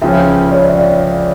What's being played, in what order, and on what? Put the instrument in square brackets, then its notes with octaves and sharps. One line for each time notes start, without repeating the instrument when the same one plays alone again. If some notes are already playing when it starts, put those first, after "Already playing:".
[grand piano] C#2 C#3 F3 C#4 [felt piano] E5 G5
[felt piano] C#5
D5
E5
D5 F5